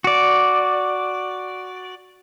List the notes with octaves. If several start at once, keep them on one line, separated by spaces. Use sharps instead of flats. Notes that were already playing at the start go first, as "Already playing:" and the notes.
F#4 D5